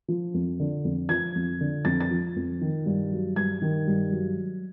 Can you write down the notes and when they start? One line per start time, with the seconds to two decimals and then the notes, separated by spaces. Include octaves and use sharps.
0.08 F3
0.34 F2
0.60 D3
0.85 F2
1.09 F3 G#6
1.35 F2
1.61 D3
1.85 F2 A6
2.01 A6
2.11 F3
2.36 F2
2.61 D#3
2.86 G2
3.12 F#3
3.36 G2 G#6
3.62 D#3
3.87 G2
4.12 F#3